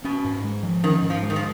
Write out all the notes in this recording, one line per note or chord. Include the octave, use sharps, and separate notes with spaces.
B2 C#4
G#2
G#3
F3
D#3 C#4
G#2
F3
G#3
D#3
F3